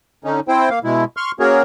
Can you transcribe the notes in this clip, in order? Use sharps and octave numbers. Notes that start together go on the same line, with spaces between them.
D3 C#4 D#4
C4 E4 C5 G5
A#3 F5
B2 G#3 E4
C6 C#6 F6
A#3 C#4 F#4 G#4 A#4 C#5